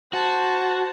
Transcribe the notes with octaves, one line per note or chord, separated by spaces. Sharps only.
F#4 C5 A5